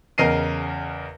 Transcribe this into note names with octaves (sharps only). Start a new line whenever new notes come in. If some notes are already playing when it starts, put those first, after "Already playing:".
E2 C#3 A#4 D#5 C7 D#7